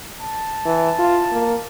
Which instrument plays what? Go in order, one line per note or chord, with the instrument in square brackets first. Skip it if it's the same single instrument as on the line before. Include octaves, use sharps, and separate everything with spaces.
[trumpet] A5
[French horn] E3
F4
A#3